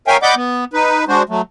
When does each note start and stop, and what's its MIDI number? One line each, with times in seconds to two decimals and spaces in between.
0.08 0.17 70
0.08 0.17 73
0.08 0.17 76
0.08 0.17 77
0.08 0.17 79
0.08 0.17 80
0.23 0.35 74
0.23 0.35 75
0.23 0.35 78
0.23 0.35 83
0.23 0.35 86
0.23 0.35 91
0.35 0.65 59
0.73 1.05 63
0.73 1.05 71
1.08 1.23 56
1.08 1.23 62
1.08 1.23 66
1.08 1.23 72
1.29 1.41 54
1.29 1.41 57